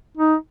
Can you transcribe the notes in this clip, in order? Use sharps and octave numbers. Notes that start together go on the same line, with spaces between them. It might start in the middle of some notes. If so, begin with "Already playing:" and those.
D#4